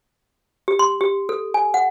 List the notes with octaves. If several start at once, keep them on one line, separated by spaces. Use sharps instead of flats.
G4
C6
G4
A4
G#5
F#5